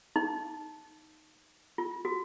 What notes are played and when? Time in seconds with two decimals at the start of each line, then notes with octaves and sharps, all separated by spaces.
0.16 D#4
1.78 F4
2.05 F#4